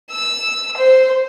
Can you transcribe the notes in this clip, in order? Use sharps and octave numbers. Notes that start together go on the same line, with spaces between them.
E6
C5